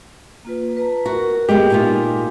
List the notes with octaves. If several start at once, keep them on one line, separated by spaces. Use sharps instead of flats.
A#3 F4 B4
B4 A5 A#5
F#4 A#4
G#3 A#3 B3 G4
A#2 D#4 F4 G#5